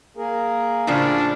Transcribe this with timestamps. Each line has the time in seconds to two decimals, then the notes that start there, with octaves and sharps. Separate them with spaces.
0.17 A#3 G#4 A#4
0.87 A2 C#3 F3 D4